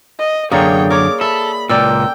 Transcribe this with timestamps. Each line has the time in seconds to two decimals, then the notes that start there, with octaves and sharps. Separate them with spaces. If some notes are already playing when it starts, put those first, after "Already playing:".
0.19 D#5
0.52 F#2 D3 A#3 G#4 C#5 D5 G5 D#6
0.90 A#4 C#5 D6
1.21 A4 E5 B5
1.70 C#2 A#2 A4 A#4 D5 G5 E6